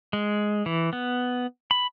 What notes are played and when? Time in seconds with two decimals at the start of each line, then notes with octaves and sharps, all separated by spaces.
0.13 G#3
0.66 E3
0.93 B3
1.71 B5